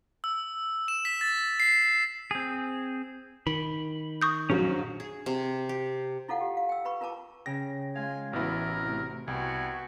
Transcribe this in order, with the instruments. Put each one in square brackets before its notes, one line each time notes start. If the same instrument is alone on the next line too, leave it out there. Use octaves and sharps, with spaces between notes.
[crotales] E6
E7
B6
A6
C7
[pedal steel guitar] C4 G#4
[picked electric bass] D#3 [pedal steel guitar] B5
[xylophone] C#6 D#6 G6
[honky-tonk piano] A#1 F#3 [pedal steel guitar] C#4 F#4
[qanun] G#4
C3
G4
[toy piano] E4 F4 A4 F5 F#5
G4
F5
G5 E6
B4 B5 C#6
F4 A#4 B4 A5 D6
[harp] C#3 G5 [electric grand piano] A#6
[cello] G#3 F4 [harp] F5 [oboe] G#5
[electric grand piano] A1 B3 E4 [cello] E3 [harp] F#4 C5 [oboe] A#4
[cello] C3 A3
[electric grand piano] C2 [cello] B3 F#4 [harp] G5 [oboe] G#5